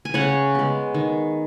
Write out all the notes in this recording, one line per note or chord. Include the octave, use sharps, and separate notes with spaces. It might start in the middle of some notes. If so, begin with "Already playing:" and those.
G#5
C#3 C#5 F#5
G#3 B3
D#3